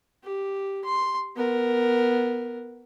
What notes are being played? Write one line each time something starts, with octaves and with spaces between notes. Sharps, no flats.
G4
C6
B3 A#4